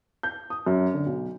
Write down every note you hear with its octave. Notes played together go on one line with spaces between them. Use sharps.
G6
D#6
F#2
D3
B1